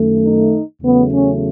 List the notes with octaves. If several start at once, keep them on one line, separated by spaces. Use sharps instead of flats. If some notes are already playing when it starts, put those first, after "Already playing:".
Already playing: F#2 D#3 A3
D#4
E2 C#3 F#3 A3 B3
C#4